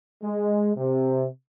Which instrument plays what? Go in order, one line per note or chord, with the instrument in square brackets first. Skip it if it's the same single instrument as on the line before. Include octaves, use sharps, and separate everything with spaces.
[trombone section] G#3
C3